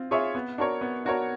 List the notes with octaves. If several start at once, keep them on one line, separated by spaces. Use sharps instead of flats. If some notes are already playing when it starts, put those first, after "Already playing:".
Already playing: C4 F4
F4 G#4 C#5 E5
B3
D4 F#4 A#4 C#5
B3
D4 F#4 A#4 C#5